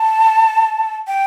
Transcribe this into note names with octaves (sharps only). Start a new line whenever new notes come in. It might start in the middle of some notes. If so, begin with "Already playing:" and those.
Already playing: A5
G5